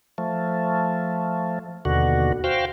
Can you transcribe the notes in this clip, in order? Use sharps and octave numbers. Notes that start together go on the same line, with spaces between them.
F3 A3
D#2 B2 D3 F#4
F#4 C5 F5 G5